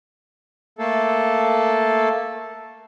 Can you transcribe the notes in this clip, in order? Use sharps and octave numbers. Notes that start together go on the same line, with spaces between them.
A3 A#3 A4